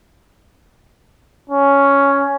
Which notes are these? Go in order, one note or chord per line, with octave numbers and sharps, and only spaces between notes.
C#4